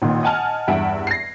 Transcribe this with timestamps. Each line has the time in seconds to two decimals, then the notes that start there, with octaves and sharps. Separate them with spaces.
0.02 A1 A#2 D#3
0.23 D#5 F#5 G#5 A5 F6
0.68 E2 G2 E5 F#5 D7
1.07 A#6 C7